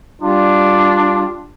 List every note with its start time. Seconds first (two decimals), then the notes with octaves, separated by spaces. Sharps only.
0.22 G3 D4 F4